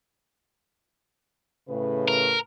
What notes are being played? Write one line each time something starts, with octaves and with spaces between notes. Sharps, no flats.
A2 C#3 B4
A#4